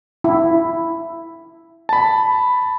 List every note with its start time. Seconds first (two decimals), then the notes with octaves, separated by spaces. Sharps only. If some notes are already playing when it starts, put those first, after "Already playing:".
0.24 E4
1.89 A5 B5